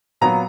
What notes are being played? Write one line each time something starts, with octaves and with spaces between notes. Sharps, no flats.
A#2 F#3 B3 F4 A#5